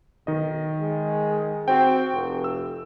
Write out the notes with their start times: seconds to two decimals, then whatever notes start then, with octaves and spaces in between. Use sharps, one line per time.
0.27 B1 D#3 D#5
0.80 G#3
1.68 C4 F#4 G5
2.12 F1
2.44 E6